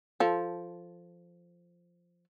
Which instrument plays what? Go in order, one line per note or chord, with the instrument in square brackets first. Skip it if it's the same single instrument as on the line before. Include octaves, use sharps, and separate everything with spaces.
[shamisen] F3 A4